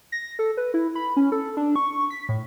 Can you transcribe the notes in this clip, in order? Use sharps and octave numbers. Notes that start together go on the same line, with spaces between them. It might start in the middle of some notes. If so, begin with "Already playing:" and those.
A#6
A4
B4
E4
B5
C#4
A4
D4
C#6
B6
A2